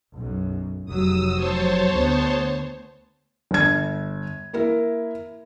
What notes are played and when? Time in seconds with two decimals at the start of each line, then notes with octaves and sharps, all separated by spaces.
0.15 B1 F#2
0.86 F1 F#3 D#6 E6
1.35 C5 C#5 A5
1.91 D2 B3
3.51 G1 G#6
4.53 A#3 E4 A#4